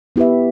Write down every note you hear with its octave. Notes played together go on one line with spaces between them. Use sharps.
B3 E4 G4 B4 E5